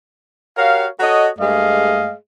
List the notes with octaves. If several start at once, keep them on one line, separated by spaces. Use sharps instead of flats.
F#4 G4 A#4 C#5 F5
F#4 A4 C#5 D#5
G2 G#3 A3 G#4 D#5 F5